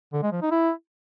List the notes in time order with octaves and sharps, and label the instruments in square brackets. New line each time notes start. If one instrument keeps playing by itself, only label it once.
[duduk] D3
G#3
F3
D#4
E4